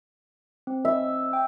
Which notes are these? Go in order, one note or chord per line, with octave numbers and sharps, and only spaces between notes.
C4
E5
G5